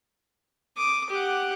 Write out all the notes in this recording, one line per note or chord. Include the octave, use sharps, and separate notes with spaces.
D6 D#6
G4 F#5